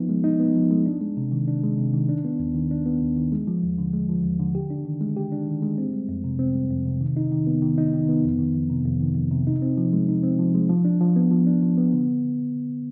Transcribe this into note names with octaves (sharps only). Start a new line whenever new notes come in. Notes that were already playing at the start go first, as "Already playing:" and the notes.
Already playing: F3 B3 D#4
G#3
D#4
B3
F3
G#3
D4
G#3
C3
D#3
D4
G#3
C3
D#3
D4
B3
D#2
D#3
D4
B3
D#2
D#3
G#3
F3
D#2
D3
G#3
F3
D#2
D3
G4
D4
D#3
G#3
G4
D4
D#3
G#3
C4
G3
F2
C3
C4
G3
F2
C3
D#3
D#4
D#3
B3
D#3
D#4
D#3
B3
F2
D#3
F2
C3
F2
D#3
F2
C3
D#4
C4
F3
G#3
D#4
C4
F3
G#3
F3
D4
F3
B3
F3
D4
F3
B3
D3